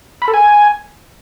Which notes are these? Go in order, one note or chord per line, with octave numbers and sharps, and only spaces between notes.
B5
A4
G#5